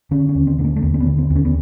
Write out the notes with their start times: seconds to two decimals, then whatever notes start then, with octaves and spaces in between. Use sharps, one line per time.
0.11 D3 C#4
0.29 C#4
0.35 D#2
0.47 C4
0.59 D3 B3
0.64 A#3
0.76 A3
0.82 D#2 A#3
0.94 C4
1.00 B3
1.06 D3
1.18 C4
1.30 D#2
1.36 C#4
1.45 B3